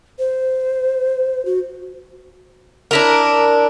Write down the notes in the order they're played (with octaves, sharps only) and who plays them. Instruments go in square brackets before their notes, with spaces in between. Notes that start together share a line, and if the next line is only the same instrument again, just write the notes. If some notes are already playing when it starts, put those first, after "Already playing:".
[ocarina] C5
F#4
[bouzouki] D4 E4 A#4